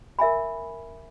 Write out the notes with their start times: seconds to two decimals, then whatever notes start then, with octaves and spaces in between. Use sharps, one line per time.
0.19 A#4 E5 G#5 B5